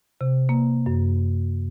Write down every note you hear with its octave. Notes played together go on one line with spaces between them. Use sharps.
C3
A#3
F#2